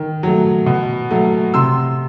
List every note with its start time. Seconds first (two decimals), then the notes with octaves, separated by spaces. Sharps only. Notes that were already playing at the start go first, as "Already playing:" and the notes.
Already playing: D#3
0.23 F#3 A3
0.66 B2
1.11 F#3 A3
1.54 C3 C6 E6